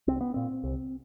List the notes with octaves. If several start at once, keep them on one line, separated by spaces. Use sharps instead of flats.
C2 C4
B3
A#2 C4
C2